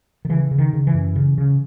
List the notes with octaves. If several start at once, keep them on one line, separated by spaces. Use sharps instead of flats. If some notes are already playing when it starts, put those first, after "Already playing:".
D#3
C#3 E3
C#3
D#3
C#3
E3
F#2
C#3
C#3